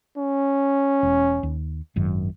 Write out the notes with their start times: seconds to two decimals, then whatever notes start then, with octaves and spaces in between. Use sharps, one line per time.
0.17 C#4
1.03 E1
1.43 D#2
1.96 G#1 F#2 D#3